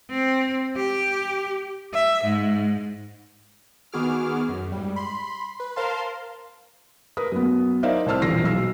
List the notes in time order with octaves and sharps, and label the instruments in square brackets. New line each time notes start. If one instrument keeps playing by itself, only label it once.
[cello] C4
G4
E5
G#2
[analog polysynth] D#3 B3 F#4 G#4 D6 F6
F#2
G#2 G3
B5 C6
B4
A#4 C5 F5 A5 C6
[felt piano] A#4 B4 D#6
F#2 B3
D#4 A#4 C5 D5 E5 F5
C2 A2 C5 A5 E6 F6
E1 A#1 A#6 C7
B1 E6 C7